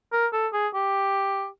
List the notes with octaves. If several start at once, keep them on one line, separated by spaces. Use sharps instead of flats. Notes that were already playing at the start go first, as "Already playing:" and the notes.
A#4
A4
G#4
G4